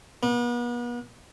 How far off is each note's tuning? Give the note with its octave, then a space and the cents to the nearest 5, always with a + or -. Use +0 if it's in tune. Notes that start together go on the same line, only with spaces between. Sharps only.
B3 -40